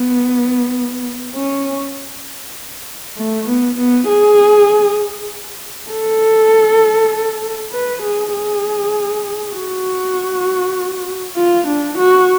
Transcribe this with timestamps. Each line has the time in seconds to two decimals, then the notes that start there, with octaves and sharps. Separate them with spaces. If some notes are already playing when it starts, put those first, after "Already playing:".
Already playing: B3
1.35 C#4
3.18 A3
3.48 B3
3.78 B3
4.08 G#4
5.91 A4
7.72 B4
8.02 G#4
8.33 G#4
9.55 F#4
11.37 F4
11.67 D4
11.98 F#4